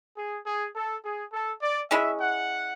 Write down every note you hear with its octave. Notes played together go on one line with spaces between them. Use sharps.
G#4
G#4
A4
G#4
A4
D5
G#3 C#4 E4 E5
F#5